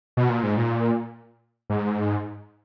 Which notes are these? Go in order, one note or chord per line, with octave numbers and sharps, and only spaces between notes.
B2
A#2
G#2
A#2
G#2